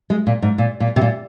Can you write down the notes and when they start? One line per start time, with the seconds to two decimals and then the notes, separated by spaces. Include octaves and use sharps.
0.10 G#3
0.27 A#2
0.42 G#2
0.58 A#2
0.80 A#2
0.96 C3
1.01 A#2